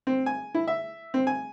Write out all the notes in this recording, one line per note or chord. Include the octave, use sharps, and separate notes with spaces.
C4
G#5
E4
E5
C4
G#5